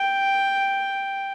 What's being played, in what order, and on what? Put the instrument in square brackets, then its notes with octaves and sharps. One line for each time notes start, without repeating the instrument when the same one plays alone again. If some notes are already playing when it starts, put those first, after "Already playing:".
Already playing: [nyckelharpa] G5